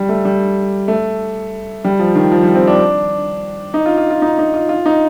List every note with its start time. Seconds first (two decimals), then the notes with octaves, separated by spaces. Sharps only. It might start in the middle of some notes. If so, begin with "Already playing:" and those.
Already playing: G3
0.09 A3
0.25 G3
0.88 A3
1.84 G3
1.99 F3
2.15 D#3
2.32 F3
2.43 G3
2.55 C4
2.67 D4
3.74 D#4
3.86 F4
3.98 F4
4.11 F4
4.22 D#4
4.39 D#4
4.54 F4
4.69 F4
4.86 D#4